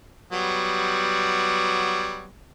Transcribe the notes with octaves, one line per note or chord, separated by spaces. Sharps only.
F#3 G3 B3